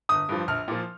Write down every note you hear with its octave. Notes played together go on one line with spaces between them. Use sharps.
G1 D#6
G2 F3
A#1 F6
A#2 F3